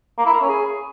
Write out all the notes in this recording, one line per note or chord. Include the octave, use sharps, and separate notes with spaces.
A#3
E4
A#4
C#4
G#4